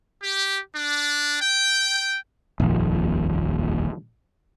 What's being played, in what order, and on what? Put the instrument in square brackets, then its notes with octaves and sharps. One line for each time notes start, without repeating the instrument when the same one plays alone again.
[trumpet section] G4
D4
G5
[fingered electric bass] D#1 A#1 F2